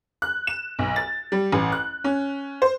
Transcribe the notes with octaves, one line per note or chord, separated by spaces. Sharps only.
F#6
E7
B1
A6
G3
A1
F#6
C#4
C5